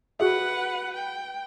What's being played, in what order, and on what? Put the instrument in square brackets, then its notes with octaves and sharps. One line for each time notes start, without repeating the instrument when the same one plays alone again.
[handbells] F#4 G#4 E5 [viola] B4 F#5
[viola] G5